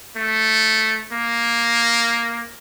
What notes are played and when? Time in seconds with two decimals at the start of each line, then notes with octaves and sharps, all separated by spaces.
0.16 A3
1.12 A#3